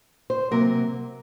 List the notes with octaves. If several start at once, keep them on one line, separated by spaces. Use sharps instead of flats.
C5
C3 F#3 A#3 A#4